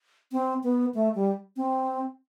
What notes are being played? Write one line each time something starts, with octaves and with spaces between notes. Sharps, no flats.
C4
B3
A3
G3
C4